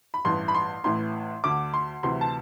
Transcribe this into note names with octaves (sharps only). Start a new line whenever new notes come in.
B5
A1 G2 E3 C6
B5
C6
A1 A2 E3 C6
D2 D3 D6
C6
D2 C3 E3 C6
A5